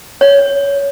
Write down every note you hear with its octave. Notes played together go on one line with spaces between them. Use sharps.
C#5